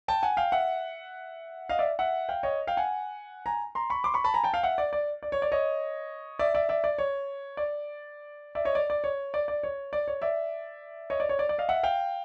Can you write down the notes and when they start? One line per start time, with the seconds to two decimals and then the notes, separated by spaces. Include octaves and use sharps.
0.08 G5 A5
0.23 F#5 G#5
0.37 F5 G5
0.52 E5 F#5
1.69 D#5 F5
1.79 D5 E5
1.99 E5 F#5
2.29 F5 G5
2.43 C#5 D#5
2.67 F5 G5
2.77 F#5 G#5
3.46 G#5 A#5
3.75 A#5 C6
3.90 B5 C#6
4.04 C6 D6
4.14 B5 C#6
4.24 A5 B5
4.34 G#5 A#5
4.44 G5 A5
4.54 F5 G5
4.63 E5 F#5
4.78 D5
4.93 D5
5.23 D5
5.32 C#5
5.42 D5
5.52 C#5 D#5
6.39 D5 E5
6.55 D5 E5
6.69 D5 E5
6.84 D5
6.98 C#5
7.57 D5
8.55 D5 E5
8.65 C#5 D#5
8.75 D5
8.90 D5
9.04 C#5
9.34 D5
9.48 D5
9.63 C#5
9.93 D5
10.08 C#5
10.22 D5 E5
11.10 C#5 D#5
11.20 D5
11.29 C#5
11.39 D5
11.49 D5
11.58 D#5 F5
11.69 E5 F#5
11.83 F5 G5